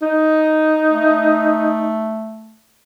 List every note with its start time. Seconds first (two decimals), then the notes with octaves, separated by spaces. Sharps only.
0.02 D#4
0.91 A3